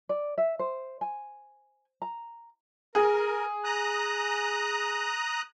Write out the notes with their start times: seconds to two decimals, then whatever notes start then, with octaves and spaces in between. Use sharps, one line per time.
0.09 D5
0.38 E5
0.59 C5
1.01 G#5
2.02 A#5
2.95 G#4 A#4
3.64 A#5 D#6 F#6